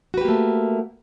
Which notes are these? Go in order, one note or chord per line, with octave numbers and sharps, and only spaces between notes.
A3 A#3 F#4 G4 B4